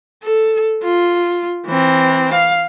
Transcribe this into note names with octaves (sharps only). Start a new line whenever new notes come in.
A4
F4
E3 C4
F5